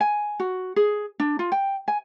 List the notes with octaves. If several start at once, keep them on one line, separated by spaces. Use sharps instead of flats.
G#5
F#4
G#4
D4
F4
G5
G#5